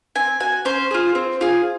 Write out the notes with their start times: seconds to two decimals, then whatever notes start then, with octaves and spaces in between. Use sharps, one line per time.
0.16 C4 G#5
0.40 F#4 G#5
0.65 C#4 C5
0.91 F4 G#4
1.15 C4
1.41 F4 G#4